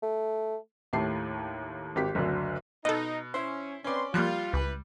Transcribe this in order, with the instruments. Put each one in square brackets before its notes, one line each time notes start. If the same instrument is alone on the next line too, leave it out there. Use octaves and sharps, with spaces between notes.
[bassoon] A3
[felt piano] D#2 A2 A3 G4 A5 C7
G#1 G4 B6
F#1 D2 D3
[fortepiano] B2 [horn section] D#4 [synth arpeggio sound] A4 D#5
[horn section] C#4 [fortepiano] E4 C5
[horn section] C4 B4 C6 [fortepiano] C#4 D5
[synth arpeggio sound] F3 A#3 [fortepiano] G3 F#6 [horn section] F4
[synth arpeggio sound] C#2 [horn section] E3 B4